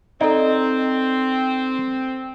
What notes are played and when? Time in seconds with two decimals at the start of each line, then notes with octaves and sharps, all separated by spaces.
0.21 C4 D#4 A4 D5